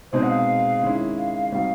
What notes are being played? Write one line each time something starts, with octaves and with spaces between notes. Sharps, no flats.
B2 G#3 C4 D#4 G#4 C5
F#5
F5
D#3 G#3 C#4 E4
F5
F5
G3 C4 D#4 F#4 F5